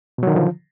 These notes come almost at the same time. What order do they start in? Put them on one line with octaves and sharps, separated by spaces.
B2 F#3 D#3 D3 F3